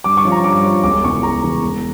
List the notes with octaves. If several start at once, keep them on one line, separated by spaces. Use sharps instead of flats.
G2 D6
C#6
F3 C#4 F4
A#5
G2 D6
F3 C#4 F4
E1 D6
E2 C#3 E3 C#6
E1 A#5
E2 C#3 E3
E1